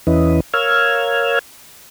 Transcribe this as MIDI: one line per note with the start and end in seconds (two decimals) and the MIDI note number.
0.07 0.40 40
0.07 0.40 52
0.07 0.40 61
0.07 0.40 64
0.07 0.40 71
0.07 0.40 75
0.54 1.39 70
0.54 1.39 73
0.54 1.39 77
0.54 1.39 88
0.54 1.39 89
0.54 1.39 92